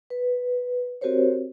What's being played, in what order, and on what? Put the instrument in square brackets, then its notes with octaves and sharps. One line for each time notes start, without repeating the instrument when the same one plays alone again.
[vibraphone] B4
C4 F#4 G4 A#4 C5 C#5